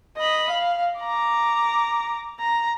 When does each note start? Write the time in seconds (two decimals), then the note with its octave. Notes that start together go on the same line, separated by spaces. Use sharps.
0.17 D#5 B5
0.50 F5
1.00 A#5 D6
2.40 A#5